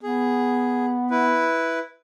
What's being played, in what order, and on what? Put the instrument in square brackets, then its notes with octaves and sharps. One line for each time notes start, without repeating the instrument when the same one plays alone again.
[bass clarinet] B3 [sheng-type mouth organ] G#4
[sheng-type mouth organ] E4 B4